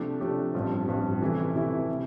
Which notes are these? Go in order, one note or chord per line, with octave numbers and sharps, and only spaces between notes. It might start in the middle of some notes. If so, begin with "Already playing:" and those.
Already playing: C3 F3 A3 D4 G4
C3 F3 A3 D4 G4
A1 G2 F3 C4
A1 G2 F3 C4
C3 E3 A3 E4
C3 E3 A3 E4
C3